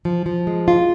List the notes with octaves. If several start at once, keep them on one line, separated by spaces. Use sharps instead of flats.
F3
F3
G#3
F4